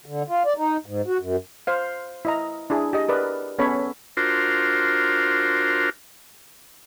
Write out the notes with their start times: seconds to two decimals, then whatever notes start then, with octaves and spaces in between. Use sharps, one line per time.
0.06 D3
0.29 F4
0.46 D5
0.57 D#4
0.86 G#2
1.07 F#4
1.20 F#2
1.67 C5 F5
2.25 E4 D#5 A#5
2.70 D4 E4 G#4
2.93 G4 D#5
3.09 A#4 B4 D5
3.59 B3 C#4 A4 C#5 B5
4.17 D4 F4 F#4 A#4 C5